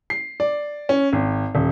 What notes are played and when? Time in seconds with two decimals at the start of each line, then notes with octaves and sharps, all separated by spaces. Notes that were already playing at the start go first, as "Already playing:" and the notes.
0.10 C7
0.40 D5
0.89 C#4
1.13 G#1
1.55 D#1